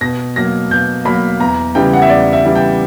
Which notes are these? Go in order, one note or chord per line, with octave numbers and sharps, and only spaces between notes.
B2 A#6
F#3 A#3 A#6
B2 G6
F#3 A#3 B5
E2 A#5
C#3 E3 G3 G5
F#5
E5
E2 D5
E5
C#3 E3 G3
G5